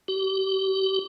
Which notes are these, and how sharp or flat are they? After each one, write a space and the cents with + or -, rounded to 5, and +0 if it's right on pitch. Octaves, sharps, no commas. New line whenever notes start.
G4 -35